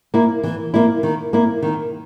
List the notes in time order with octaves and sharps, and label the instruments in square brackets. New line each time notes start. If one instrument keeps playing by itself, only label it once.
[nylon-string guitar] A#3 E4
E3
A#3 E4
D#3
A#3 E4
D#3